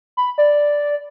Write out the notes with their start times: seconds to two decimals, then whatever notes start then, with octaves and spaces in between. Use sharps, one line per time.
0.17 B5
0.38 D5